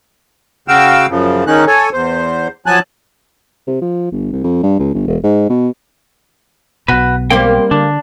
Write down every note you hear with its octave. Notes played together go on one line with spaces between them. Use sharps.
C#3 F#4 F5 G5 E6
F#2 C#3 F3
D#3 G#3 C#4 D#4 F#6
A4 C#5 G#5
E2 C5
F3 F#3 G#5 A5 F#6
C3
F3
G1
C2
F2
G2
C#2
G1
E1
G#2
B2
B1 B2 F#4 B4
G3 A#3 C4 G5
D3 D4